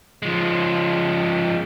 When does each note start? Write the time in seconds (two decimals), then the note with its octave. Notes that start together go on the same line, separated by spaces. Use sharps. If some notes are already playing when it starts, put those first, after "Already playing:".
0.22 F3 G#3